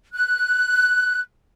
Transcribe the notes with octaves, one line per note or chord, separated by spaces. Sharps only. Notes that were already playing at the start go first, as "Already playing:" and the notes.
F#6